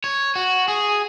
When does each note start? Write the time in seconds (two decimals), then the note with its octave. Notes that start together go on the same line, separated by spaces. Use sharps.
0.04 C#5
0.36 F#4
0.68 G#4